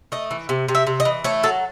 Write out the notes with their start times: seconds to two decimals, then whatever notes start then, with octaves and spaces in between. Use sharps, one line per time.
0.12 A3 D#5
0.31 E3
0.49 C3
0.68 C3
0.75 E5
0.87 C3
1.00 D#5
1.05 E3
1.24 A3 C#5
1.43 F#3 A4